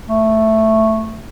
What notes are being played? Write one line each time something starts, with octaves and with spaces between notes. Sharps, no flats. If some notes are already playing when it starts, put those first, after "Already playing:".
A3